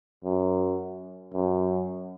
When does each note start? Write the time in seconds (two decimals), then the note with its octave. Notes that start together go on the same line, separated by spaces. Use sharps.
0.24 F#2
1.33 F#2